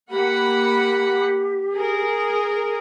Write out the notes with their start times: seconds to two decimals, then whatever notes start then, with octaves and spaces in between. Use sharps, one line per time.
0.10 A#3 G4 F#5 B5
1.73 G#4 A#4